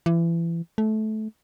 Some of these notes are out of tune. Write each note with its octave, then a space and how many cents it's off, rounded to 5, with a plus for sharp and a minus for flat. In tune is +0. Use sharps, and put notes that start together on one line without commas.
E3 +30
A3 -20